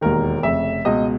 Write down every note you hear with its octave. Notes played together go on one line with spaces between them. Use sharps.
E1 D#2 D#3 A#4
F1 F2 C#3 E5
C#2 B2 D#5